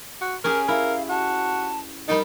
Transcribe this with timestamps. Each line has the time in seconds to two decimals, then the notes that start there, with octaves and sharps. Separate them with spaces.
0.22 F#4
0.44 C#4 G4 G#4 A#4
0.68 E4 A#4 F5
1.09 F#4 A5
2.08 G3 D#4 A#4 G5 A5